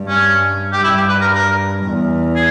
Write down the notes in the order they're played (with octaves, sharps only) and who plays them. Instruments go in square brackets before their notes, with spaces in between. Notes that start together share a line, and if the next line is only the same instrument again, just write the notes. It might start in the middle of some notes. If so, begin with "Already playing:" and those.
Already playing: [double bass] G2
[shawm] C#4
G4
[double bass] G2 [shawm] E4
[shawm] G4
B4
A#4
A#4
[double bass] E2
[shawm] G#4